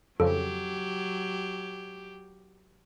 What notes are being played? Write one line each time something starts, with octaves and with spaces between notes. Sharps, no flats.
F2 C#3 F3 F#3 G4 A4